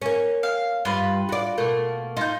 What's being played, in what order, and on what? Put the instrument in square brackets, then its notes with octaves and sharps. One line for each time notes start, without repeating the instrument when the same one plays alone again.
[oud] A#3 C#4
[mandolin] F5
[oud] G2 [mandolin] F4 B4
[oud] F#4 D5
B2 A3 A#3
[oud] D#4 [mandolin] F4 G6